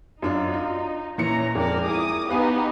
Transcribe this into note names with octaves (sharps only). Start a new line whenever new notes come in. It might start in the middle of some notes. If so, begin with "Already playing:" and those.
F#2 D4 D#4 F4
F4
A#2 E3 C#4 A#5 C#7
F2 G#3 A#4 D5
E4 G#4 D6 D#6
B3 D#4 G4 B4 F5 G#5